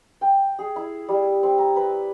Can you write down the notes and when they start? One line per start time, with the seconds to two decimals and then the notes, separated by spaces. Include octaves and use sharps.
0.21 G5
0.59 G#4
0.76 E4
1.09 G3
1.43 C4
1.58 A#5
1.76 B4